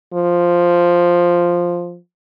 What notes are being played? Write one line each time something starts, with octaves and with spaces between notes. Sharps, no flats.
F3